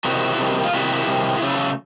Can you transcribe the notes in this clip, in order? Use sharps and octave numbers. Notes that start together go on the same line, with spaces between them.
C3 D#3 G3 E4 F#4
C3 D#3 G3
F4
C3 D#3 G3 E4 F#4
C3 D#3 G3
C#3 F#3 A3